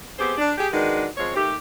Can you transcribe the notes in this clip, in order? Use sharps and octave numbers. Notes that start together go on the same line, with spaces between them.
B3 C4 G4 G#4 C5
D4
G4 G#4
D#3 G#3 D4 F#4 B4
F3 G#3 C4 C#5
D#3 A3 G4